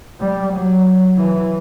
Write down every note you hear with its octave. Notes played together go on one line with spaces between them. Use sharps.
G3
F#3
E3